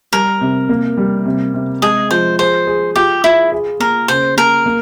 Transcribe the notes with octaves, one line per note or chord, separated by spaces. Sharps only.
G3 A#4
C3
A#3
G3
C3
C3
G#3 G#4
F3 C5
G#4 C5
G#4
F4 G4
E4 F4
G#4
A#3 A#4
C#3 C5
A#3 A#4
A#3